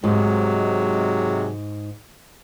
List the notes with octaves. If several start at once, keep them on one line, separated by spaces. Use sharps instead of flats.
G#2 C3 F#3 G#3